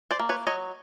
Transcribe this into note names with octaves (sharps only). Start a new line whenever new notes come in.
C5 D5
A#3
B4 C#5
F#3 C#5 D#5